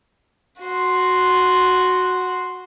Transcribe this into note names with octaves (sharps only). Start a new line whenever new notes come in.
F#4 C6